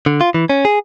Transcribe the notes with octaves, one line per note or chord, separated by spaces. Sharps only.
D3
F4
E3
C#4
G#4